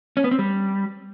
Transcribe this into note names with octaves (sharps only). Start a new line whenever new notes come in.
C#4
B3
C4
G3